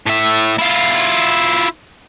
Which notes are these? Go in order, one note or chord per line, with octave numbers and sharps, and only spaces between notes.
A2 E5
E4 F4